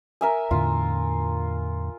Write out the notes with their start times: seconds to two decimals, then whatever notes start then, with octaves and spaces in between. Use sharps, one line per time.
0.21 A#4 E5 G#5
0.51 E2 A2 D3 F4